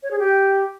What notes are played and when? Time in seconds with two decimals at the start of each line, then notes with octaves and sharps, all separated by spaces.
0.03 C#5
0.11 G#4
0.19 G4